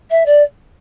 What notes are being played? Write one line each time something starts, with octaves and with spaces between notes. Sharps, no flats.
E5
D5